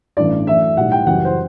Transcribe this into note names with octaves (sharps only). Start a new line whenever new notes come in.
A1 G2 E3 A3 D5
F#2 E3 A3 E5
B1 A2 G3 F#5
G5
F#1 F#2 E3 G3 F#5
C5